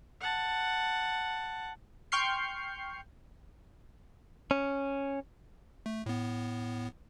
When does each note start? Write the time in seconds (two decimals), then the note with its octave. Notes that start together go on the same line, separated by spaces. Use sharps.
0.21 F#5 A5
2.12 G5 C6 C#6 F6 G6 C7
4.51 C#4
5.86 A3
6.06 A2 B3